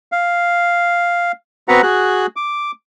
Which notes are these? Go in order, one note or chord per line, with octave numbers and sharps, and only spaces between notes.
F5
B3 C4 F#4 B4 F#5 A#5
F#4 G#4 F#6
D6